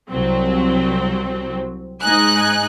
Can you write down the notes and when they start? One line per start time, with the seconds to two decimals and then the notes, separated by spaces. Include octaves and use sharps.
0.10 C2 F#3 C4
2.02 G#2 D#4 G#5 F#6